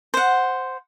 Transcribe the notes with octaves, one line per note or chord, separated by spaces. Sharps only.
C5 F#5